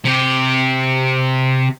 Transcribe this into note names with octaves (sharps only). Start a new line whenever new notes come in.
C3 G4